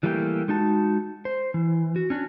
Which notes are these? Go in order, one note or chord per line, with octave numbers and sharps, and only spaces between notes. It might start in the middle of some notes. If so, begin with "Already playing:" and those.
E3 G3 A3 A#3 D#4 G4
G#3 D#4 F#4 A5
C5
E3
F#4
C#4 D4 F#4